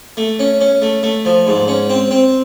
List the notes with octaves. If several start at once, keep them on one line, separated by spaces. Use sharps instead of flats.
A3
C#4
C#4
A3
A3
F3
G#2
C#4
C4
C4